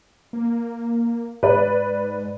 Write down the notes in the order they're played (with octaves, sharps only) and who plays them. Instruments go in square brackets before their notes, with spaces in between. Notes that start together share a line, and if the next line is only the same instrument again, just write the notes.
[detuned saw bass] A#3
[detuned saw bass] G#2 [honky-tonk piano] B4 D5